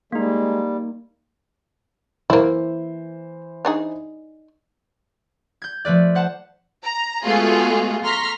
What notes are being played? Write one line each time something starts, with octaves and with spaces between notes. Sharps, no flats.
G3 G#3 A#3 D#4
E3 A#3 E4 C5
D4 D#4 G#4
G6 G#6
F3 A3 B4 D5
C5 F#5 A5
A#5
G#3 A3 B3 F4 F#4 G#4
A#5 C6 C#6 F6 A#6 B6